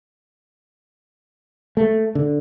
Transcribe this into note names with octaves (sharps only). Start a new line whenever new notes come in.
A3
D3